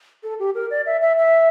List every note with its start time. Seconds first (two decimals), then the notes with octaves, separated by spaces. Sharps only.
0.23 A4
0.39 G4
0.55 A#4
0.70 D5
0.86 E5
1.01 E5
1.17 E5